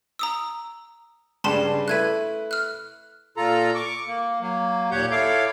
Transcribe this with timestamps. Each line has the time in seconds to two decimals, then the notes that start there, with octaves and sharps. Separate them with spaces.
0.19 A#5 D#6 E6
1.44 G2 C#3 G3 A5 C6 E7
1.88 A3 E4 B4 F#6 G#6 D#7
2.51 F6 F#6
3.37 A#2 F4 A4 A#5
3.75 C#6 D6
4.08 A#3
4.41 F#3 A#3
4.91 D#2 A#2 G4 C#5 F#5 G6
5.11 E4 A4 C#5 F5 D6